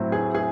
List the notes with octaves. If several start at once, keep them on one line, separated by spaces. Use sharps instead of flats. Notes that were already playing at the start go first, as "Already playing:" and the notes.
Already playing: A2 F#3 A3 C4 E4
G#4
G#4